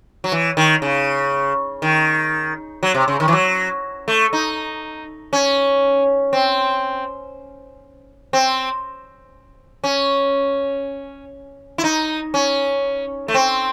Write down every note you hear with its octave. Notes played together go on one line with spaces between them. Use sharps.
F#3
E3
D#3
C#3
D#3
F#3
C3
C#3
D#3
E3
F#3
A3
D#4
C#4
C4
C4
C#4
E4
D#4
C#4
A3
C4